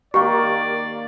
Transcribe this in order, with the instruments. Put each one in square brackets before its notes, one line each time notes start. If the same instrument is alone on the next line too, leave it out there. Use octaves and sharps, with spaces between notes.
[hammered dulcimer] D#3 A#3 [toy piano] G4 [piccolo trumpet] D5 [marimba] C#6